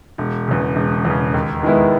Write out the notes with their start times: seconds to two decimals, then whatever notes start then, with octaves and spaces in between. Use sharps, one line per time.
0.18 E1
0.48 E2 C#3
0.76 E1
1.05 E2 C#3
1.34 D#2
1.63 D#3 G#3 B3 E4